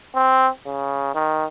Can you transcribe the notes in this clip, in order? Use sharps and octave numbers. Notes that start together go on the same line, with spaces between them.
C4
C#3
D#3